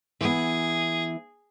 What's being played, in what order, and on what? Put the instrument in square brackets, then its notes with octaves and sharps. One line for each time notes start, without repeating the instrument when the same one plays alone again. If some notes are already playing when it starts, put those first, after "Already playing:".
[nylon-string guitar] E3 B3 [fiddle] G#4